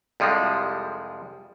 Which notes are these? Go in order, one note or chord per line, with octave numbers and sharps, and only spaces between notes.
C2 F2 F3 G3 G#3